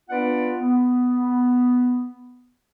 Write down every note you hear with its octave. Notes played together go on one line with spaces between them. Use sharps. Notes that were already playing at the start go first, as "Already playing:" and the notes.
B3 D4 F4 B4 D5 F#5
B3